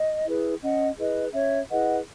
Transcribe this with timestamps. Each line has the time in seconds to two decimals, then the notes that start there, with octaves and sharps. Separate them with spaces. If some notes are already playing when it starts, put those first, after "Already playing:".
Already playing: D#5
0.26 E4 G#4 B4
0.62 C#4 D#5 F#5
0.99 E4 G#4 B4 D#5
1.34 C#4 C#5 E5
1.70 E4 G#4 B4 D#5 F#5